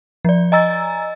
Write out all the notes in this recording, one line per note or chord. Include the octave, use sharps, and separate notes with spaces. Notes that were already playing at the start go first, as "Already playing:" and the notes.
F3 D5
D#5 G#5 A#5 E6 A6